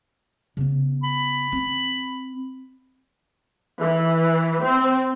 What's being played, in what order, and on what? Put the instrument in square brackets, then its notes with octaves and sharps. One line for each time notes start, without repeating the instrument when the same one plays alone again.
[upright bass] C#3 B3
[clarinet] B5
[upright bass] C4
[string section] E3
C4